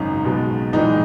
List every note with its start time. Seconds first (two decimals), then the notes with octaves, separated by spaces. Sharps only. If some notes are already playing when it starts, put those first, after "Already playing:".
Already playing: G#1 F#2 C#3 D#4
0.25 B1 B2 G#3
0.73 A#1 G#2 E3 G#3 D#4